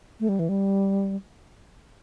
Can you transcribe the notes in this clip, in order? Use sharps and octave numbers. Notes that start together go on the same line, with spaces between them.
A3
G3
E3
G3